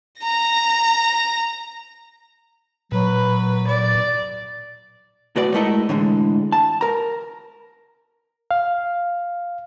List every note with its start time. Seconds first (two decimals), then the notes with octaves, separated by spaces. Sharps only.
0.22 A#5 A#6
2.92 A#2 F#3 B4
3.68 D5
5.36 B1 A2 F#4 B4 D5
5.54 G#3 A3 E4 A4 A#4 D#5
5.89 A2 D3 E3 G#3
6.52 A5
6.81 A#4 A#5
8.51 F5